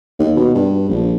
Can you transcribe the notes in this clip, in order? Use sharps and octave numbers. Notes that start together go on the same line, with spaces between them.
D#2
B2
G2
A#1